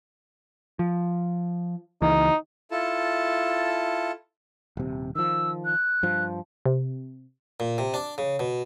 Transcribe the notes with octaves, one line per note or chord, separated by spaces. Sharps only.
F3
C#2 E3 D#4
E4 F4 A4 A5
D#1 C3
D#3 F3 E6
F#6
G2 F3
C3
A#2
C3
D4
C#3
B2